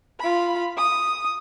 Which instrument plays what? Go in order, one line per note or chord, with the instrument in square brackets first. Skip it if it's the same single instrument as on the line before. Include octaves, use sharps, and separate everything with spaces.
[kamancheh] F4 B5
D#6